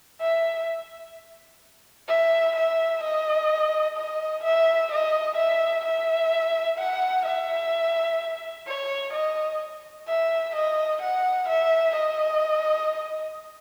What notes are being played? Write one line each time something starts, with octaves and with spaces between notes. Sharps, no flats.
E5
E5
E5
D#5
D#5
E5
D#5
E5
E5
F#5
E5
C#5
D#5
E5
D#5
F#5
E5
D#5